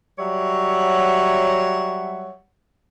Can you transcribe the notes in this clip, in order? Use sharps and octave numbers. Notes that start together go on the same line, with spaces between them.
F#3 G3 C#5 E5 F#5